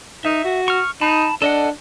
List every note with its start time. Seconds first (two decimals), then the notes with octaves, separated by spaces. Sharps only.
0.25 D#4 E5
0.44 F#4
0.68 C#6 F6
1.01 D#4 A5 B5
1.42 D4 A4 D#5 F#5